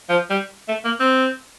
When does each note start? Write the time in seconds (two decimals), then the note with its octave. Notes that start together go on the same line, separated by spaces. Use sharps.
0.09 F3
0.30 G3
0.68 A3
0.84 A#3
1.00 C4